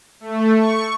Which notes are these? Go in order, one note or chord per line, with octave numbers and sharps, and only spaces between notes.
A3
C#6